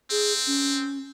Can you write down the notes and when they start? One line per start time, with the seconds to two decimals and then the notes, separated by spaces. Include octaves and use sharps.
0.11 C4 G#4
0.47 C#4